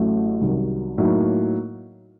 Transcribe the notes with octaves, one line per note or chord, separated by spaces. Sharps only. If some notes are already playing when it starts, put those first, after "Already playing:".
Already playing: A1 A2 F#3 A3
C2 C3 D#3 F#3
A2 F#3 A#3 D#4